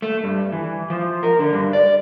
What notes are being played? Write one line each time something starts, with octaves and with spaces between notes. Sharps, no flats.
A3
G2
E3
F3
A#4
D3
G2
D5